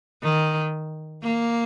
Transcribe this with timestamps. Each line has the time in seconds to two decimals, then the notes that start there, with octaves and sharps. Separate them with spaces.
0.23 D#3
1.23 A#3